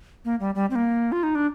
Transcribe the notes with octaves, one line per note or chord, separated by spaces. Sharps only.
A#3
G3
G3
C4
A#3
F4
D#4
D4